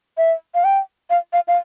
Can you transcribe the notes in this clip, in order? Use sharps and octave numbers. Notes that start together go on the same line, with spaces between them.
E5
F5
G5
F5
F5
F5